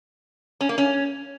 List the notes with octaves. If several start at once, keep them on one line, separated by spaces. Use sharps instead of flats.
C#4
A#3
C#4